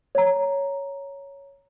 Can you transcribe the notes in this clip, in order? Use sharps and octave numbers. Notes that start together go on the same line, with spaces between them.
C#5 A#5